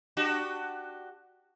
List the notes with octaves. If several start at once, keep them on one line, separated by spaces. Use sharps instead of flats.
D4 F#4 G4